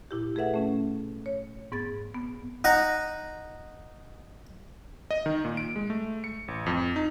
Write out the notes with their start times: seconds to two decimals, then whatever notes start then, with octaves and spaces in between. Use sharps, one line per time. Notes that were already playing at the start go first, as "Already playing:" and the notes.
0.11 A#2 E4 G4
0.35 A3 G#4 A4 B4 E5 F#5
0.54 A3 C#4
1.26 C#5
1.72 G#2 B3 G#4 A6
2.15 B3
2.64 D#4 F#5 A#5
5.11 D#5
5.26 D#3
5.45 A#2
5.57 D7
5.76 G#3
5.90 A3
6.24 C#7
6.48 A1
6.66 F2
6.96 D#4